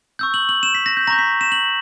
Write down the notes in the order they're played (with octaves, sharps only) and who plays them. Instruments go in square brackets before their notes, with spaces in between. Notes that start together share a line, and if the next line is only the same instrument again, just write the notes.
[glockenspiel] C#6 E6 G6
F#7
F#7
E7
B6
A#6
G6
A#5 C#6 G6 A#6
B6
E7
F#7